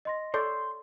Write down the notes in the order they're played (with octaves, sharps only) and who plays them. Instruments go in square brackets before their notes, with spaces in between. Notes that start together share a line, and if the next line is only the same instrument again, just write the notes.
[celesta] D#5 C6 A#6
[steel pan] A4 C#5 D5 [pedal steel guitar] C6 [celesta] G6